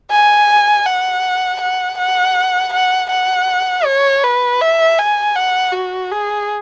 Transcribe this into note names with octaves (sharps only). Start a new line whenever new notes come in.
G#5
F#5
F#5
F#5
F#5
F#5
C#5
B4
E5
G#5
F#5
F#4
G#4